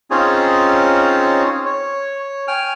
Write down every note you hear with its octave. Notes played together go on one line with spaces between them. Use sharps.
C4 C#4 D#4 F4 G#4 C#5
C#5
G5 G#5 F6